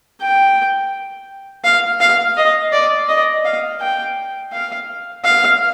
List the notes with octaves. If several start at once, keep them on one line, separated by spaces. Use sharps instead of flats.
G5
F5
F5
D#5
D5
D#5
F5
G5
F5
F5